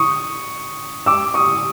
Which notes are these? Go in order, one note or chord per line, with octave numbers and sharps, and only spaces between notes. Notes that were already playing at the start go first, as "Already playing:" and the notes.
Already playing: C#6 D#6
D6 E6
C#6 D#6